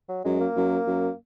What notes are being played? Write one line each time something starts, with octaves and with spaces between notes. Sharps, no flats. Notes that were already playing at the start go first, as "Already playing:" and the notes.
F#3
F#2 G#3
A#3
F#2
F#2